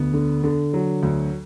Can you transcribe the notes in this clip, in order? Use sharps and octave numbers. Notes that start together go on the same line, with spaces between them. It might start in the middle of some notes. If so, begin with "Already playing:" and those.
Already playing: D2 B3
D3
D3
F#3
D2